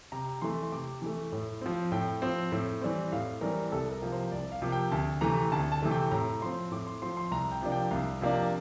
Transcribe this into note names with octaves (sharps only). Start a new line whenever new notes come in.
C3 A#5
E3 A3 C6
C6
C3 D6
E3 A3
A2
F3 C4
A2 G5
F3 C4
A2
E3 G3 C4
A2 F5
E3 G3 C4 A#4
C2 A4
A#4
C3 F3 A#3
C5
C2 D5
F5
C3 F3 A#3
G5
D2 A5
C3 E3 A3 A#5
D2 A5
A5
C3 E3 A3
G5
A2 A#5
F3 C4 C6
A2 D6
C6
F3 C4 C6
C6
C2 A#5
G5
C3 F3 A#3 D4
G5
C2 F5
C3 F3 A#3 D4